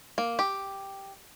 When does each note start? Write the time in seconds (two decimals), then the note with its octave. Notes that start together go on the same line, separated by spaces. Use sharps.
0.18 A#3
0.39 G4